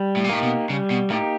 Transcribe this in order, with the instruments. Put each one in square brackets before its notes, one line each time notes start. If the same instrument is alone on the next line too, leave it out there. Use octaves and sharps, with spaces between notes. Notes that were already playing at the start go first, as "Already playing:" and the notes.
Already playing: [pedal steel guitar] G3
[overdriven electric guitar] A2
A#2
[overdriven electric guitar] A2 [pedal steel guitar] A#3 D#4 G4
[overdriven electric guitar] B2
[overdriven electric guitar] C#3 [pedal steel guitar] G3
[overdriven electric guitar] B2
[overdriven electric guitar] A2 [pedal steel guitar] A#3 D#4 G4